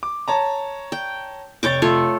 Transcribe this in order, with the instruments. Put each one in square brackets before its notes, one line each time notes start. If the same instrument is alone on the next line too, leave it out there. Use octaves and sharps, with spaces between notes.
[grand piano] D6
C#5 A5 A#5
[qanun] G5
[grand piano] F1 A6 [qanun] C#5 G5 D6
[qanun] A3 F4 C#5